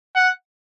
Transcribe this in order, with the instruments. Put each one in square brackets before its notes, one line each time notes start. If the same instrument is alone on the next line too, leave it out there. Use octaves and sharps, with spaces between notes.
[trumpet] F#5